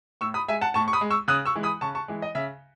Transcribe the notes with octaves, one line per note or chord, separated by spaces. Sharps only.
A2 C#6 E6
B5 D#6
G#3 E5 G#5
F#5 A5
A2 A5 C#6
C#6
B5 D#6
G#3
C#6 E6
C#3 D#6 F#6
C#6 E6
E3 G#3
B5 D#6
C#3 A5 C#6
A5 C#6
E3 G#3
D#5
C#3 E5